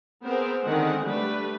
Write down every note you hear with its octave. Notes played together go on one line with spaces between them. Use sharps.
B3 C4 G#4 A#4 C5
D3 D#3 G#3 C4 F#5
G3 A3 D4 B4